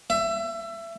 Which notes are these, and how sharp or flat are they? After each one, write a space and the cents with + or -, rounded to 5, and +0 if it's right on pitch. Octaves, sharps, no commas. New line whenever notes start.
E5 +25